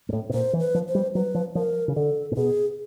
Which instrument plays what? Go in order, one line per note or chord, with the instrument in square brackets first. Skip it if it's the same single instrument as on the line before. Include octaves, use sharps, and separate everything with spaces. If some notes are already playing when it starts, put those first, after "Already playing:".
[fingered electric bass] G#2
A2
B2
[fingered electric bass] A#2 [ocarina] C5
[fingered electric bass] E3
[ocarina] B4
[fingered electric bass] F3
[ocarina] C5
[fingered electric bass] G3
[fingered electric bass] F#3 [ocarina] B4
[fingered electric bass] F3
[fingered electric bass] F3 [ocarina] A#4
[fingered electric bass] C#3
[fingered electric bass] D3 [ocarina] A4
[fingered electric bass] A#2
[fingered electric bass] B2 [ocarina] G#4